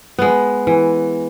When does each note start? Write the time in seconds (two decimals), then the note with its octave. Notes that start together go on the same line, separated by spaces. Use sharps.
0.19 G#3 B3
0.67 E3